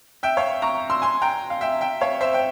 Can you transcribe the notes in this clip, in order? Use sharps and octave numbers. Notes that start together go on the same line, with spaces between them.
E5 G5
C#5 F5
A#5 C#6
C6 E6
G#5 C6
G5 A#5
F5
E5 G5
E5 G5
C#5 F5
C5 E5
G5